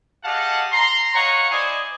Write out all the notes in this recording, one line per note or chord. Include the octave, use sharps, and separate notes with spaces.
G4 G#4 D#5 F5 F#5 A5
A#5 C6
C#5 D#5 F5 F#5 A#5 C#6
E4 C5 D5 D#5 G#5